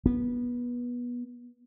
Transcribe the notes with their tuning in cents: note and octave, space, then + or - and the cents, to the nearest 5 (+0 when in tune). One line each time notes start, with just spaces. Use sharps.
B3 -20